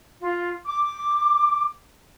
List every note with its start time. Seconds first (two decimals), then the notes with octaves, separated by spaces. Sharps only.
0.21 F4
0.65 D6